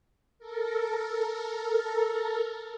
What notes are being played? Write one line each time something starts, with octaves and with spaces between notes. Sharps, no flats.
A4 A#4